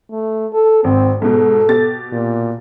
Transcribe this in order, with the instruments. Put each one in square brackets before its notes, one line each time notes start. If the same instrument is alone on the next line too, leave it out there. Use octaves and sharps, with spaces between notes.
[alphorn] A3
A4
[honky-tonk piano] G#1 [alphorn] C4
[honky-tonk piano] G#2 B2 [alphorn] A4
[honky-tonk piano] B2 G4 A6
[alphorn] A#2